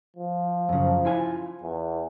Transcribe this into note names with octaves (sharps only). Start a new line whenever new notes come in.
F3
F#2 C#3
E4 F4 G#5
E2